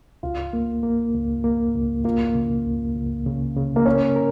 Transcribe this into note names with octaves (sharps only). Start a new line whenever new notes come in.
C#2 F4
A#3
A#3
C#2
A#3
C#2
A#3 F4
C#3
C#2
C#2
C#3
C#3
A#3
C#4 A#4
A#4